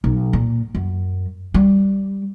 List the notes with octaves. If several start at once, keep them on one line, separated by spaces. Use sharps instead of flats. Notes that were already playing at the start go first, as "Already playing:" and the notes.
B1
A#2
F#2
G3